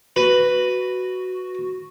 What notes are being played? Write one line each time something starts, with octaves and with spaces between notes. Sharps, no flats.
F#4 B4